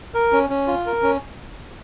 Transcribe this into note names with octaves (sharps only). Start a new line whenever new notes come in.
A#4
C#4
C#4
F4
A#4
C#4